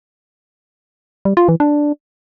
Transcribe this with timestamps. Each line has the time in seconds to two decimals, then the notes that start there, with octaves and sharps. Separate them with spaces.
1.25 G3
1.37 F4
1.48 E3
1.60 D4